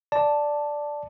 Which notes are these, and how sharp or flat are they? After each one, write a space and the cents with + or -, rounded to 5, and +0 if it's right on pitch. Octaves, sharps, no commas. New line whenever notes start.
D5 +0 A5 +0